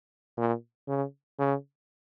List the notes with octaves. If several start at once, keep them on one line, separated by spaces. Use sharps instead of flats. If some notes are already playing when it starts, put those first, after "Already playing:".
A#2
C#3
C#3